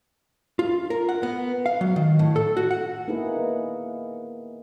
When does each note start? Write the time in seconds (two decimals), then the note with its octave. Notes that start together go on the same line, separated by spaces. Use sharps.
0.59 F4
0.90 A#4
1.09 F#5
1.23 B3
1.66 F5
1.81 F#3
1.96 D#3
2.19 A2
2.36 A4
2.57 F#4
2.71 F#5
3.08 A#3 B3 D#4 E4 G#4 B4